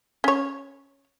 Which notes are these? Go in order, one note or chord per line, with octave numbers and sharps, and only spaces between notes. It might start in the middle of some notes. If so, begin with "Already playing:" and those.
C#4 C#5